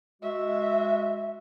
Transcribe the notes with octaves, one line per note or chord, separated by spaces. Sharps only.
G#3 F#4 E5